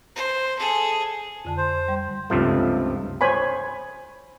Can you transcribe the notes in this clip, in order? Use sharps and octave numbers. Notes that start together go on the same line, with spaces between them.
C5
G#4 A4
F2 D3 A5
C5
G3
C#2 G2 C3 F3 A3
C5 C#5 G#5 B5